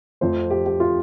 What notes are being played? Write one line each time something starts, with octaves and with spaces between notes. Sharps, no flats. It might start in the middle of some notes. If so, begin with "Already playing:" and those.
F2 F3 A3 C5
G4
G4
F4